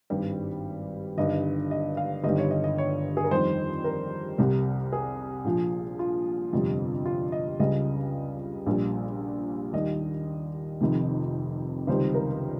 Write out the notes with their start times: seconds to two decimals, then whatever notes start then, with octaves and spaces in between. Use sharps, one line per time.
0.10 G#1 G2 G3
1.18 G1 G2 D#3 D#5
1.71 D#5
1.97 F5
2.24 G1 G2 D#3 G3 D#5
2.38 C#5
2.51 D#5
2.64 D#5
2.78 C#5
3.17 G#4
3.24 A#4
3.31 F2 D#3 G3 C5
3.84 A#4
4.38 C2 C3 G3
4.92 G#4
5.45 A#1 A#2 F3
5.99 F4
6.53 G1 F2 C3 G3
7.06 F4
7.32 D#5
7.60 C#2 C#3 G3 D#5
8.66 A#1 A#2 G3
9.73 D#2 D#3 G3 D#5
10.80 F1 F2 C3 D#3
11.87 C#2 C3 D#3 G3 C5
12.14 A#4